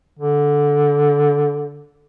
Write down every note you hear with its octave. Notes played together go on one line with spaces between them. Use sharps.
D3